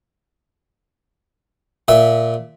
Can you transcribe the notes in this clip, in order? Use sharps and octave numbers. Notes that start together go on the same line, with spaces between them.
A#2 E5